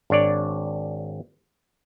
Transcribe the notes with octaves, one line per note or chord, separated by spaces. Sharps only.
G#1 D4 C#5 D5